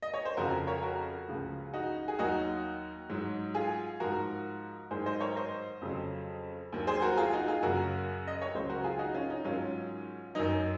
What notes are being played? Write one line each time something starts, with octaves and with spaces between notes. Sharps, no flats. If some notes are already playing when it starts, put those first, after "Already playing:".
D#5
C#5
C5
F2 C#3 F3 F#4 A#4
A#4 C#5
F#4 A#4
C#2 C#3 F3
D#4 F#4
G#4
D#2 D#3 F#3 D#4 F#4
G#2 F#3
F4 G#4
G#2 F3 F#4 A#4
G#2 D#3 F#3 G#4 C5
C5 D#5
A#4 C#5
C5 D#5
F2 C#3 F#3
D#2 D#3 F#3
G#4 C5
F#4 A#4
F4 G#4
D#4 F#4
F4 G#4
F#2 C#3 F#3 F#4 A#4
D#5
C#5
C#2 C#3 F#3 C5
F#4 A#4
F4 G#4
D#4 F#4
C#4 F4
D#4
G#2 D#3 F#3 C#4 F4
F#2 D#3 F#3 D#4